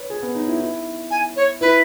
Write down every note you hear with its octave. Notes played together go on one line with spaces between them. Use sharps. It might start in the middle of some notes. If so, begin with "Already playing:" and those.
Already playing: B4 C#5
G#4
B3
D#4
E4
E4
G#5
C#5
E4 B4